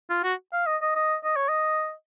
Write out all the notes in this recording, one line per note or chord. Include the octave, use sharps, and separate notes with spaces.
F4
F#4
F5
D#5
D#5
D#5
D#5
C#5
D#5